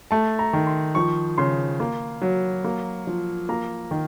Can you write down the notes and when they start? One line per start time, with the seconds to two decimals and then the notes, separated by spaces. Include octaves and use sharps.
0.11 A3 A5
0.39 A#5
0.53 D#3
0.67 C6
0.95 F3 C#6
1.38 C#3 C6
1.80 A#3
2.22 F#3
2.64 A#3
3.07 F3
3.49 A#3 A#5
3.91 D#3